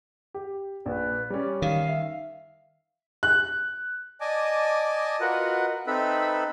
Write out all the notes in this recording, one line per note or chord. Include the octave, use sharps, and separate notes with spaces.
G4
A#1 B4
G3 C#4 D5
D#3 F5
E5
F#6
D5 D#5 G#5 A5 D6
F4 F#4 A#4 B4 D#5 F#5
C4 D#4 A4 B4 E5 B5